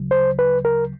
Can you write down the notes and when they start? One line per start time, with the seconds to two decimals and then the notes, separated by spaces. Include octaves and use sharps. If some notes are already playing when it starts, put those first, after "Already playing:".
Already playing: D2 C#3 F#3
0.11 C5
0.39 B4
0.65 A#4